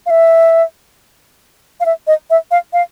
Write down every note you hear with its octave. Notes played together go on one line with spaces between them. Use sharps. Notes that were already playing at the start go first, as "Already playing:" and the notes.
F5
E5
F5
E5
D#5
E5
F5
F5